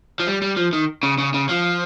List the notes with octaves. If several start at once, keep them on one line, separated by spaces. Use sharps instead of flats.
F3
G3
G3
F3
D#3
C#3
C#3
C#3
F3